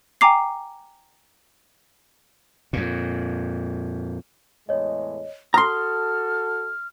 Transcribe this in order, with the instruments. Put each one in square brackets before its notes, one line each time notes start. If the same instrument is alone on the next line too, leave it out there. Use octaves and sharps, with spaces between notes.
[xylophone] G5 G#5 A#5 D6 C7
[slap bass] F2 A#2
[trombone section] E2 A2 G#3 [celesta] C#5 D#5
[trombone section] F#4 A4 [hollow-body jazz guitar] A#5 C6 [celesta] D#6 [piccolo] F6